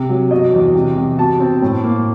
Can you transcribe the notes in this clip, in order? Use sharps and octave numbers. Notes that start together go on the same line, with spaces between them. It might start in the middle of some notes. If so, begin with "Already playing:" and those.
Already playing: C3
F#3
B2 D#5
E2
C3
C3
B2 A5
C4
A2
A#3